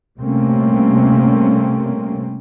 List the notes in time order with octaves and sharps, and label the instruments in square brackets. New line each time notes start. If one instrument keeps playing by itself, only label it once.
[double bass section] C3 G3 A3 A#3 C4 C#4